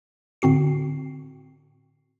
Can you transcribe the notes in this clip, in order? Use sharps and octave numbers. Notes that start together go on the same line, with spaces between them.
A2 D3 C4 F#4 C7